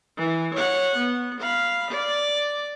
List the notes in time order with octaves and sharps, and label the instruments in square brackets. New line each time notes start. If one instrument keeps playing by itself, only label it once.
[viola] E3
C#5 F#5
B3
F5 B5
D5